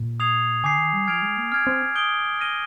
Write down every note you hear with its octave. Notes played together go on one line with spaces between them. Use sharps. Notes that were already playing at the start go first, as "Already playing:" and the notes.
Already playing: A#2
D#6 G#6 C7 F7
D3 G#5 D6 G6 C7
D#3
G3
F3 F6 G#6 D7 F7
G#3
A#3
C4 F6 G#6 D7
C4
D#6 G6 D7 G7
F6 A#6 D#7 G7